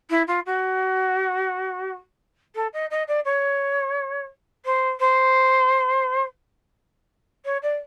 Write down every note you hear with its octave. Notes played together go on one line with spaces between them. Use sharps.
E4
F4
F#4
A4
D#5
D#5
D5
C#5
C5
C5
C#5
D5